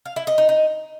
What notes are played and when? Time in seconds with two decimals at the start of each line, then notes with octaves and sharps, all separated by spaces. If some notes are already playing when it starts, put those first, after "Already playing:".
0.05 F5
0.16 E4
0.27 D#5
0.38 D#4
0.49 D#4